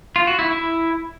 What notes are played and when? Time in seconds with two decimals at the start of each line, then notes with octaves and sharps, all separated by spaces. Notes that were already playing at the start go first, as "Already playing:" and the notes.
0.16 F4
0.27 F#4
0.39 E4
0.50 E4